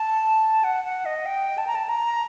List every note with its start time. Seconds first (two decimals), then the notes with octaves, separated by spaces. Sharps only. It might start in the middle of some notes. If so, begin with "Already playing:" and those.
Already playing: A5
0.64 F#5
0.85 F#5
1.06 D#5
1.26 G5
1.58 A5
1.67 A#5
1.75 A5
1.89 A#5